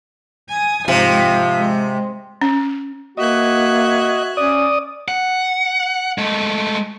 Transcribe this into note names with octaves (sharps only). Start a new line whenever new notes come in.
G#5 D#6
G#2 C3 F3
G#3
C#4
A#3 F#4 D#5 E5 F#6 G#6
C#4 D5 D#6
F#5
G#3 A3